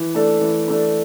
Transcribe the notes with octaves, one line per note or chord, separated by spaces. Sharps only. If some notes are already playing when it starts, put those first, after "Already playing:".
Already playing: E3
A3 D4 A4
E3
A3 D4 A4